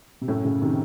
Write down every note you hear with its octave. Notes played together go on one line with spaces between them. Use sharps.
C3
F#2 A2
A2 C#3
C3 D#3